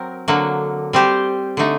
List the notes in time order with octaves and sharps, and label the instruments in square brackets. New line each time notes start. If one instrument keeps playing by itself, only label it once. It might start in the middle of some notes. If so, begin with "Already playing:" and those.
Already playing: [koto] F#3 C4 A#4
D3 F#3 A#3
G3 C4 G4 C5
D3 A3 D#4